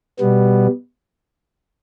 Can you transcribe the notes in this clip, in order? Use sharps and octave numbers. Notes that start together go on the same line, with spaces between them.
B2 G3 B3